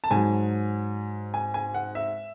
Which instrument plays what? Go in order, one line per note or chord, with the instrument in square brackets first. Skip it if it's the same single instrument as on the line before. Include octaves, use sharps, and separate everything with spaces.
[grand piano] A5
G#2 F#3 G#5
G#5
G#5
F#5
E5